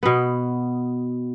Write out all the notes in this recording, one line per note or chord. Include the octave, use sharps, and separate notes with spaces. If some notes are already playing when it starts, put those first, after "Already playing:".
B2 B3